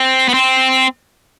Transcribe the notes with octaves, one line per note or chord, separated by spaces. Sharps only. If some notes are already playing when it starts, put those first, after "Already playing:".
Already playing: C4
B3
C4